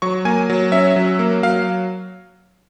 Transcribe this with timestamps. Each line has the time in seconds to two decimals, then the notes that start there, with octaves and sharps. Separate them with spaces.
0.02 F#3 C#6
0.25 A#3 G#5
0.50 F#3
0.72 C#4 E5
0.96 F#3
1.19 A#3
1.43 F#3 F5